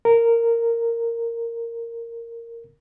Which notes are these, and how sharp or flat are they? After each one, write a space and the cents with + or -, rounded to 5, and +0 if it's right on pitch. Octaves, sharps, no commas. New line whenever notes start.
A#4 -10